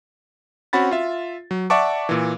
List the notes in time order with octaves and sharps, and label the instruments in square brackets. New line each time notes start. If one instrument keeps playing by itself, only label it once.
[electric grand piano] C4 C#4 F#4 F#5 B5 A6
F4 E5
F#3
D5 E5 F#5 A5 C#6 D6
A#2 E3